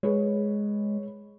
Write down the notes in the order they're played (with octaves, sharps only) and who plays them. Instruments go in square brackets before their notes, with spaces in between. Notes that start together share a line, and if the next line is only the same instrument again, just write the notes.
[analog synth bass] G#3 [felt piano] G#4 B4 C#5